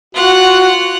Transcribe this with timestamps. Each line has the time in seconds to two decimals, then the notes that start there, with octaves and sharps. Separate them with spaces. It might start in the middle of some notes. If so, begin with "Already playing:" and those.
0.15 F4 F#4 F#5